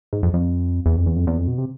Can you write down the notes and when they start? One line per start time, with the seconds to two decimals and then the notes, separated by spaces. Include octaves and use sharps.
0.13 G#2
0.23 F2
0.34 F2
0.86 E2
0.96 F2
1.06 E2
1.16 F2
1.27 E2
1.37 F2
1.48 B2
1.58 C3